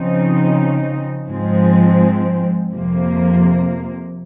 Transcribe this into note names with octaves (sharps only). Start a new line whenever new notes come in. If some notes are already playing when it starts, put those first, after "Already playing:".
Already playing: C#3 F3 C4 D#4
G#2 F3 G#3 C4
F2 C3 F3 A#3